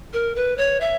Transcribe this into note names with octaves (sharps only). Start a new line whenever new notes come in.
A#4
B4
C#5
E5